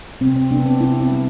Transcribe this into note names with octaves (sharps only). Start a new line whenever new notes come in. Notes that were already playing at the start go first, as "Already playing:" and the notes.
C3 C4
C4
C3 B3 D4
C4
C3 C4 E4
C4 E4
G3